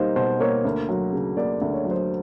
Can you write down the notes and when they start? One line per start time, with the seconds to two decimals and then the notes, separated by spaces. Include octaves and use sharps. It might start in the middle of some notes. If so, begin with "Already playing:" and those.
Already playing: B2 G3 A#3 D#4 C5 F5
0.16 B2 C5
0.40 A#3 C#5
0.65 D2
0.89 F#3
1.12 C#3
1.37 A#3 D5
1.61 D2
1.73 C#5
1.85 F#3
1.91 C5